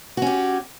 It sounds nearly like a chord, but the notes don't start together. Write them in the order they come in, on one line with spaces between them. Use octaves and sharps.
F#4 C#4 G4